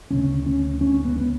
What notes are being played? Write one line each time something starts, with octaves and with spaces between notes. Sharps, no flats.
D2 C#3 C#4
C#4
C#4
B3
B3